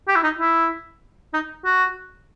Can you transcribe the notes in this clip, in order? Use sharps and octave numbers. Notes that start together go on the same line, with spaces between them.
G4
E4
D#4
E4
D#4
F#4